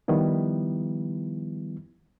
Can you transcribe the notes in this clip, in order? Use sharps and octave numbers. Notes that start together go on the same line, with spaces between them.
D#3 F3 G3 B3 E4